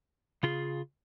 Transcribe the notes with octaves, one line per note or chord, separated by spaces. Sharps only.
C#3 F4 G#4